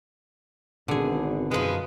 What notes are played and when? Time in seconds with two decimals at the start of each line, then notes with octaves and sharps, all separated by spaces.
0.88 G#1 B2 D3 G#4
1.51 F#2 F3 G#3 A#4 B4 F5